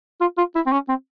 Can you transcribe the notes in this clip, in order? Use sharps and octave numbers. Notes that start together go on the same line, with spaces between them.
F4
F4
E4
C4
C#4
C4